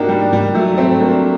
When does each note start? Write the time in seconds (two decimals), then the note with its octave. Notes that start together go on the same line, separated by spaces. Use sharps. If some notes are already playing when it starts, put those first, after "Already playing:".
Already playing: A#3 D4 D#4 F#4 G4
0.09 G3
0.33 G3
0.55 F#3 A3
0.78 A3 C4
1.00 A#3 D4